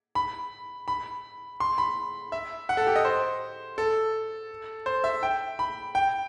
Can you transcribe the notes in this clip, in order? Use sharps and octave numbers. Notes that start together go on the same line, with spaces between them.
B5
B5
C6
B5
E5
F#5
A4
G4
D#5
C5
A4
C5
E5
G5
B5
G5